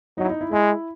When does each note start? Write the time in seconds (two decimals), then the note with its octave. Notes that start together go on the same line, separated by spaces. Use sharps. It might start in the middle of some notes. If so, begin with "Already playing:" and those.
0.18 F#3 D#4
0.24 E4
0.29 D#4
0.41 E4
0.51 G#3 E4